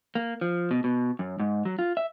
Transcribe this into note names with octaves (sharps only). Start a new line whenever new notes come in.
A#3
F3
B2
B2
F#2
G#2
F#3
F4
E5